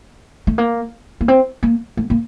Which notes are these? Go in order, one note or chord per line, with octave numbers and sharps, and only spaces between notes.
A3
A#3
A#3
C4
A#3
A3
A#3